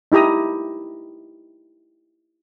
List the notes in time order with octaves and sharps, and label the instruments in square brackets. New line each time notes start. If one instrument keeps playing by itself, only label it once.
[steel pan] D#4 E4 G4 A#5 D#6